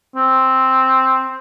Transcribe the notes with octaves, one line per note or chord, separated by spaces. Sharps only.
C4